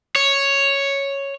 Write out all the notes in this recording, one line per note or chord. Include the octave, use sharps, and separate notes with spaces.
C#5